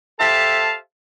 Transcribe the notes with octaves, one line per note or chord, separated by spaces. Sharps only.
G4 A4 C5 E5 F5 A5